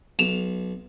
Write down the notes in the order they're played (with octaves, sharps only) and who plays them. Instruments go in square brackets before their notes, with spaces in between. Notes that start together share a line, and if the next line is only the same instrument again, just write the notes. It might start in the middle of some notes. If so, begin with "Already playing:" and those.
[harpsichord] B1 [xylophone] E7 F7